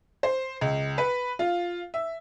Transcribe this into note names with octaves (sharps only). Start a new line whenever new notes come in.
C5
C#2
B4
F4
E5